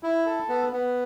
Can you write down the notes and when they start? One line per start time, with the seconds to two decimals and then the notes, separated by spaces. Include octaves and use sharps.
0.03 E4
0.26 A4
0.49 B3
0.73 B3